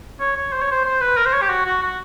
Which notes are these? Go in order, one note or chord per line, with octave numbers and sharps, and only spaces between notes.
C#5
C#5
C5
C#5
C5
C5
B4
A#4
C5
C#5
G4
F#4
F#4
F#4